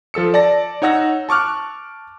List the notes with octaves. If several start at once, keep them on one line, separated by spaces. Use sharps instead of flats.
F3 A4 E6 C#7
D5 A5 A#6
D#4 C#5 F#5 E6 A#6
A5 C#6 D6 F6 F#6